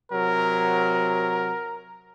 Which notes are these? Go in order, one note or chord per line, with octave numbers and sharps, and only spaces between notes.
C3 F#3 A#4